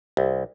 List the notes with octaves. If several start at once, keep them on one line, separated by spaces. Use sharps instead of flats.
C2